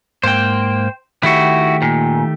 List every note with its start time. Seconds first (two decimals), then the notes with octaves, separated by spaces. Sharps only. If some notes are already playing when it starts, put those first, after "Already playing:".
0.23 G#2 A#3 C5 G5
1.23 D#3 A3 E4 F#4 G4
1.82 A#2